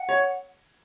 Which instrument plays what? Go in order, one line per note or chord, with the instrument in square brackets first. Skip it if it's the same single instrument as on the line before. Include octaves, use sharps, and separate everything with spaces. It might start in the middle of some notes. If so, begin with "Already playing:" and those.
Already playing: [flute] F#5
[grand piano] C#5